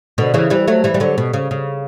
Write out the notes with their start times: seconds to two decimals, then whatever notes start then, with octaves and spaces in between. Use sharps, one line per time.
0.18 B2 D3
0.34 C#3 E3
0.50 E3 G3
0.68 F#3 A3
0.84 E3 G3
0.94 G3
1.00 D3 F#3
1.18 B2
1.33 C#3
1.51 C#3